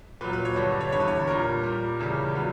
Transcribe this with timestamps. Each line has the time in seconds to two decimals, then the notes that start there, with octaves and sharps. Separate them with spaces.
0.21 A#2 F#3 B4
0.33 B4
0.45 C#5
0.56 G2 D3 G3 B4
0.81 C#5
0.92 E2 D3 G3 C#5
1.00 B4
1.08 C#5
1.27 A#2 G3 A#4
1.64 A#2 G3
1.99 E2 C#3 G3
2.35 A#2 F#3 B4